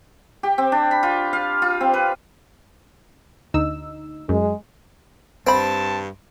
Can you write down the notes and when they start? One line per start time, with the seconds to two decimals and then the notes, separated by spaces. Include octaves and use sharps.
0.43 G4
0.58 C4
0.72 D4
0.91 B5
1.03 F4
1.33 F5
1.62 F4
1.81 C4
1.94 B4
3.54 D2 D#4 E6
4.29 F#2 G#3
5.47 G2 C4 C5 A5 B5